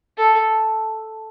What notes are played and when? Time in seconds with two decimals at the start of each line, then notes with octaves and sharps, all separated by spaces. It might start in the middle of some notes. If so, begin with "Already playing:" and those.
0.17 A4